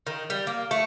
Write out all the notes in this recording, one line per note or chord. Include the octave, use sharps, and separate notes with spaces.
D#3
G3
A#3
A3